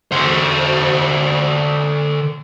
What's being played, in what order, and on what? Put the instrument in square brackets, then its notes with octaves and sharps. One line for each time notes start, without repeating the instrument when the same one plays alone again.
[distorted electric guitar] D3 C5